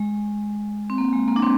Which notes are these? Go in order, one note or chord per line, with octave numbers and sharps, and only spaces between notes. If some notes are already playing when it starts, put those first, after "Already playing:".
Already playing: G#3
C4
A#3
G#3
A#3
D4
C4